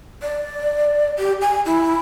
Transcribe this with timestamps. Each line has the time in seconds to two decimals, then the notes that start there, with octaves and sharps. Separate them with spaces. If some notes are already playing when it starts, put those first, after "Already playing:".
0.22 D5
1.19 G4
1.41 G#5
1.66 E4